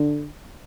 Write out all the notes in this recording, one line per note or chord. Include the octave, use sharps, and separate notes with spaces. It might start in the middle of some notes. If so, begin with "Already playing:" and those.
Already playing: D3